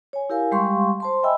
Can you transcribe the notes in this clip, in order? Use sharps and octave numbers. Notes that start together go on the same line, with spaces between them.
C#5 G#5
E4 G4 A#4 F5 G#5
G3 G#3 G4 F5 C6 C#6
C5 A5 C6
D#5 E5 G5 G#5 B5 E6